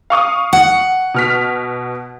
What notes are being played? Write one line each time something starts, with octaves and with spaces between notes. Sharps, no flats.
F5 C#6 D#6
F#5
B2 F6 B6